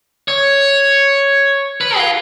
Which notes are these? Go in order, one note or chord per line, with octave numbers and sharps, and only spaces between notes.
C#5
B4
F4